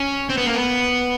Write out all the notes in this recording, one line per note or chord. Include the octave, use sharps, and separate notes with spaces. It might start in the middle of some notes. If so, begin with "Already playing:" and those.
Already playing: C#4
C4
B3
A#3
B3